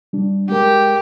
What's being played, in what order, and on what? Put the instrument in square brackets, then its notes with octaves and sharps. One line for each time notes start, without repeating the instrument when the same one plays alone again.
[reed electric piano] G3 D4
[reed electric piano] G#3 A#4 [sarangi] G4